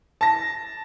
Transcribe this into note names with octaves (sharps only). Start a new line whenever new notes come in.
A5 A#6